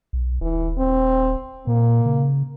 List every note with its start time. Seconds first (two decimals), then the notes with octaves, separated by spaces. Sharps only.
0.13 B1
0.41 D#1 E3
0.78 C4
1.67 A#2 A#3
2.06 C#3